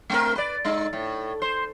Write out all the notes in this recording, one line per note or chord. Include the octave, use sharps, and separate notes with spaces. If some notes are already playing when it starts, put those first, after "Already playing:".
A3 C4 A#4
B4 D5
G#3 D#4
A2
C5